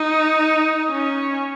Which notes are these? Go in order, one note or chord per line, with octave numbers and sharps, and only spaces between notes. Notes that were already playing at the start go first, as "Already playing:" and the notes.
Already playing: D#4
C#4